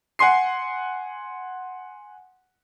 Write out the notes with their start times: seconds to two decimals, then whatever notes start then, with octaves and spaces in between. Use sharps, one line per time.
0.19 F#5 G#5 C6 C7